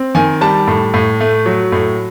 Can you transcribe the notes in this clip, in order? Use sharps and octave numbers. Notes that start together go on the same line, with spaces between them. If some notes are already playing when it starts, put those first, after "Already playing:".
Already playing: C4
D#3 G#5
G3 A5
A2
A2
A3
F#3
A2